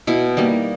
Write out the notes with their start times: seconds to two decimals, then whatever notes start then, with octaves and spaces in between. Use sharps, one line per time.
0.07 B2 E4
0.37 G3 A#3 D#4